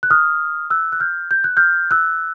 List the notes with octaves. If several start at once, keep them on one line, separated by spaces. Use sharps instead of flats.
F#6
D#6 F6
E6 F#6
F#6
F6 G6
G6
F#6
F6 G6
E6 F#6